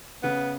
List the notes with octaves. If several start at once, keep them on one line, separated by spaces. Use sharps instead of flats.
C#3 B3